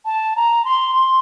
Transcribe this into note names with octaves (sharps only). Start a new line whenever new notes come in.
A5
A#5
C6
C6